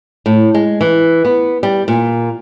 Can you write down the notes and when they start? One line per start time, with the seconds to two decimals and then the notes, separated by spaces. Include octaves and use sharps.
0.26 A2
0.54 G#3
0.81 E3
1.25 B3
1.63 G3
1.88 A#2